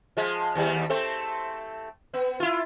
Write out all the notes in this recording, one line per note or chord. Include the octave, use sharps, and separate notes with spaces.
F3 G#3
D#2 G3
A3 C4 A4
B3
E4 F4